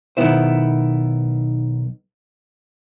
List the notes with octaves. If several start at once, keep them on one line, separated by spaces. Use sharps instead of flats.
B1 A#2 D#3 B3 E4 C5